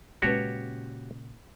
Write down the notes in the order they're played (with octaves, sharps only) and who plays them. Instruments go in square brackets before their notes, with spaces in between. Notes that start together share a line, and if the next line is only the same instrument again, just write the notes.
[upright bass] A#2 C#3 [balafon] G#3 C#4 B4 [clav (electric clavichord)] F#4 G4 C#5